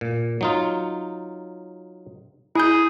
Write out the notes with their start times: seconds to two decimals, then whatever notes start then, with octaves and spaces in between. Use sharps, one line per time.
0.01 A#2
0.41 F#3 D#4 F4
2.55 E4 G#4 G6